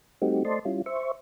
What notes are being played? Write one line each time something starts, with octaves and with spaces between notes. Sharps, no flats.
G3 A3 C4 D#4 F#4 G4
A3 C5 D5 D#5 A5 C6
G3 C#4 E4 F4
C5 E5 C#6